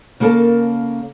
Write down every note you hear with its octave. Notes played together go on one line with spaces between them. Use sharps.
C#3 A#3 F#4 A4 A#4 A5